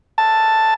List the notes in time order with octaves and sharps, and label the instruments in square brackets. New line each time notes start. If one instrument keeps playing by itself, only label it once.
[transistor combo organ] A5